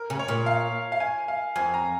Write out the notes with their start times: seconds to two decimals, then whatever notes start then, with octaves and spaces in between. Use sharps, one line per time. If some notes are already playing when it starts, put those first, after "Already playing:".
Already playing: A#4
0.10 C#3
0.19 C#5
0.28 A#2
0.46 F5
0.92 F5
1.00 G#5
1.28 F5
1.56 F2 G#5
1.74 A#5